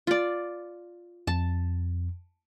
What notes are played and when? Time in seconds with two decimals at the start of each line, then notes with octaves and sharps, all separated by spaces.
0.07 F4 D5
1.27 F2 A5